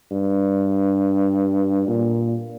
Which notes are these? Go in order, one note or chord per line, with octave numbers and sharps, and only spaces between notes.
G2
A#2